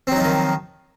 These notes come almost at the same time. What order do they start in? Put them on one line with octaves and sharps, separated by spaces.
C4 F#3 D#4 F3 D#3